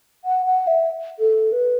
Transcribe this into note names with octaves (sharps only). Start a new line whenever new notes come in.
F#5
F#5
E5
A4
B4